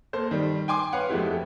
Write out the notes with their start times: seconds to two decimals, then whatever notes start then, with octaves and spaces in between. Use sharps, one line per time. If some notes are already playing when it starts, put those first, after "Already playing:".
0.13 A#3 A4 C5
0.31 D#3 G3
0.68 G5 G#5 C6 D6
0.93 B4 C#5 F5 F#5
1.09 F2 G#3 A3 E4 G4